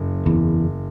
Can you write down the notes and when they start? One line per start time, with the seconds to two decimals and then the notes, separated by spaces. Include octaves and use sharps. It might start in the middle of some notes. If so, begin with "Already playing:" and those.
Already playing: F#1 F#2
0.26 E2